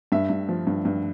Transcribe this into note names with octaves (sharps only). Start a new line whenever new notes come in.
G2 E5
G2
F3
G2
G2